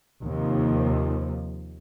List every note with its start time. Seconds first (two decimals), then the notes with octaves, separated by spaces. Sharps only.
0.22 D#2 C3 F3